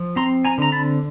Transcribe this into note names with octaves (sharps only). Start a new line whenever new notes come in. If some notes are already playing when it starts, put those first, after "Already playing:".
Already playing: F3
C4 A#5 C6
G#5 A#5
D3 A#5
A5 B5